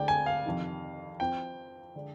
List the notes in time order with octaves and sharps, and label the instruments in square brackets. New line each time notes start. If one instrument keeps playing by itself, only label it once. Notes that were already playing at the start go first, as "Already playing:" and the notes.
Already playing: [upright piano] D2 D3 G#3 C4 [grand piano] D5 G5
[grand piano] G#5
F5
[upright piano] F2 C3 D#3
[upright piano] F3 C4 F4 [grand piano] G5
[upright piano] D3 G#3 D4